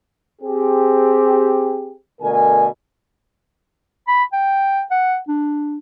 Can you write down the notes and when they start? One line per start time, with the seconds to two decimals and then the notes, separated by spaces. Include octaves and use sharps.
0.42 C4 G4 G#4
2.22 B2 D3 A3 A#4 G#5
4.08 B5
4.33 G5
4.91 F#5
5.28 D4